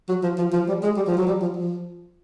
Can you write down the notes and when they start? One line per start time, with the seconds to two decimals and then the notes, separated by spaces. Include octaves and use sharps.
0.09 F#3
0.23 F3
0.38 F3
0.53 F3
0.68 G3
0.83 G#3
0.97 G3
1.08 F3
1.17 F#3
1.27 G3
1.42 F3
1.57 F3